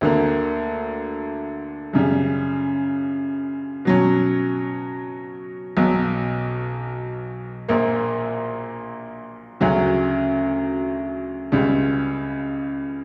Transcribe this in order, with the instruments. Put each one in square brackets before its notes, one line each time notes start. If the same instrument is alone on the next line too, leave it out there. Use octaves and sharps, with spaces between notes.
[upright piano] D2 D3 A#3
F#2 C#3 G3
B2 F#3 C#4
B1 B2 F#3
A#1 A#2 A#3
D2 C#3 F#3 C#4 F#4
C#2 C#3 G3